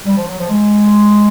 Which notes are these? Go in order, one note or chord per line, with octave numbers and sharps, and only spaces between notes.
G3
F3
F#3
F3
G#3